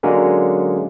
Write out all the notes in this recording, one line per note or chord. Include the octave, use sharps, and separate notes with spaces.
D3 F#3 G#3 A#3 C#4